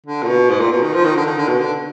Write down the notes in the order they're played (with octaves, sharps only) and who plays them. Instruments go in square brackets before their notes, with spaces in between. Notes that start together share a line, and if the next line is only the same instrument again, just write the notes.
[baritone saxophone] D3
A#2
B2
G#2
A#2
B2
D#3
F3
D#3
D3
D#3
D3
B2
D3